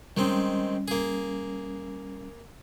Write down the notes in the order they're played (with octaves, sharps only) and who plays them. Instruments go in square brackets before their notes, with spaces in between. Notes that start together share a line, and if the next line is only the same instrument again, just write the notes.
[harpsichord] D#3 G#3 C4 [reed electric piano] G3 C#4
[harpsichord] A#3 G#4